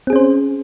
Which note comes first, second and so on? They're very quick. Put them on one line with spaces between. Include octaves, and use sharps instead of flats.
C4 G#4 C#4 C5